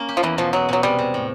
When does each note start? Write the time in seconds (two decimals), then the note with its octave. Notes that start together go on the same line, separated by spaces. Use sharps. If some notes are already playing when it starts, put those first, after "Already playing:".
Already playing: A#3 C#4
0.09 G4
0.17 F3
0.23 E2 E3
0.38 B2 F3
0.53 F#3 G#3
0.69 B2 F#3
0.83 C3 G3
0.99 C3
1.14 A2